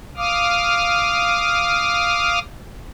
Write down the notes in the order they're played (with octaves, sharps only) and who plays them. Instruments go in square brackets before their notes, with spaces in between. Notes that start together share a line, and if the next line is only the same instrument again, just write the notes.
[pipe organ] F5 D6 D#6 F6